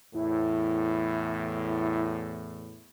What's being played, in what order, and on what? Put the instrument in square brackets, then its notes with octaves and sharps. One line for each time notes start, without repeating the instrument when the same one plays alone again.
[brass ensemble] E2 A2 [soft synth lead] E4